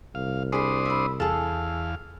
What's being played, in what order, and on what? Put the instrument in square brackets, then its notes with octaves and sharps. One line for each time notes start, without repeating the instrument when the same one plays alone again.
[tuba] C2 [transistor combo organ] F5
[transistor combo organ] D4 C5 D#6 [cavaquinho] G#4 B5
[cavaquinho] E5 B5
[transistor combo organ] E2 F5 [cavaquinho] G#4 A4